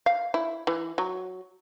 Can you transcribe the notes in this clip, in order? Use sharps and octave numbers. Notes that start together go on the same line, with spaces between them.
F5
E4
E3
F#3